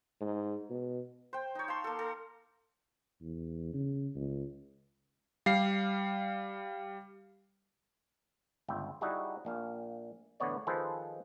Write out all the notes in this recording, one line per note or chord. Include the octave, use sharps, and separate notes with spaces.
G#2
B2
C5 G5
D#4 C#5
F5 A5 C6
A#3 A4
A4
E2
C#3
C#2
G3 F5 C7
G1 C#2 E5 G5
G3 D#4 E4 F#4 G#4
A#1 A#2 F5
A2 D3 E3 B3 C#5 D5
D#3 F3 G#4 A4 B4 C5